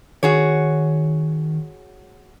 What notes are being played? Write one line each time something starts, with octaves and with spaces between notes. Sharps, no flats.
D#3 F#4 G#4 C#5